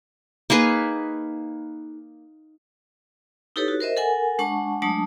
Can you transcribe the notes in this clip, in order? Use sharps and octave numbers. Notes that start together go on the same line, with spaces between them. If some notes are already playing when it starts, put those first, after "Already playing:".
A#3 D#4 G#4 B4
D#4 E4 G4 A4 B4 C#5
F#4
A#4 C5 D#5 E5
A4 A#4 F#5 G#5
G#3 D4 F#5 A5 C#6
F#3 G#3 A3 D4 A5 D#6